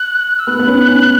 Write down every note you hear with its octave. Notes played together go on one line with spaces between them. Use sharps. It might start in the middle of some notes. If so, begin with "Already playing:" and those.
Already playing: F#6
E6
B3 F#6
B3
C#4
C#4